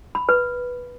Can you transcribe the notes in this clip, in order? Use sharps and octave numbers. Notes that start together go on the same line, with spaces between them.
B5
B4